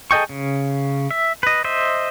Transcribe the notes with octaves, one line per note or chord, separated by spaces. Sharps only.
G#4 A4 D#5 G5 C#6
C#3
E5
B4 D#5
C5 D#5 E5